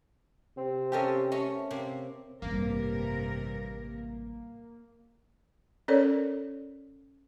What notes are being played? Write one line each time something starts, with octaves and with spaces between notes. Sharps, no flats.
C3 C4
C#4 G4 A4 A#4 D#5 F5
A3 C#4 D#5
C3 A#3 C4
A1 G2 C3 G3 A#3 A#4
C#4 A4 A#4 C#5 D5